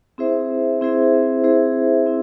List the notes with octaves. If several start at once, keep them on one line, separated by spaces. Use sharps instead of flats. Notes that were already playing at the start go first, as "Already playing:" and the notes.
C4 E4 G#4 C5 E5
C4 E4 G#4 C5 E5
C4 E4 G#4 C5 E5
C4 E4